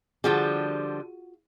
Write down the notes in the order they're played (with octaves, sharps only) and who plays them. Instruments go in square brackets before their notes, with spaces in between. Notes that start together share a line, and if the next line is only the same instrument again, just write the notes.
[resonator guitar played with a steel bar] D3 F3 G3 [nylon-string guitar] F4 F#4 G#4